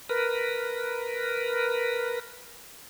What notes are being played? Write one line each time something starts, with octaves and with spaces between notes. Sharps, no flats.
A#4 B4